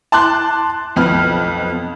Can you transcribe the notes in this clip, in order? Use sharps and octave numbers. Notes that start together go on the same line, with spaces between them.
A5 C6 D6 F#6
B1 F2 B4 F6